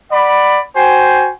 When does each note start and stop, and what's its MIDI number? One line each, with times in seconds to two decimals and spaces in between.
0.11 0.60 74
0.11 0.60 78
0.11 0.60 83
0.75 1.30 66
0.75 1.30 72
0.75 1.30 79
0.75 1.30 80